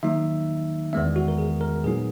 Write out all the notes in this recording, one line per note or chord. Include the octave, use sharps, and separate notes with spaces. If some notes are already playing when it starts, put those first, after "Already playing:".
D#3 F#3 A#3 D#4 E5
E2 D#3 G#3 B3 E5
F#4
A#4
G#4
A#4
A#2 F#3 B3 D#4 G#4